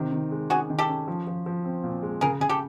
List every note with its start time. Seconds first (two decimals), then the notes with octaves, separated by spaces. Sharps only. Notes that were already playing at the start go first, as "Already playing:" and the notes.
Already playing: C3 D#3
0.12 D#3
0.31 G#3
0.50 C#4 F#4 G#4
0.70 D#3
0.78 G4 A4
0.89 C#4
1.08 F3
1.27 F3
1.46 F3
1.65 C4
1.84 A#2
2.02 G#3
2.21 C#3 G#4 A#4
2.40 C#3 G#4
2.49 G4 A4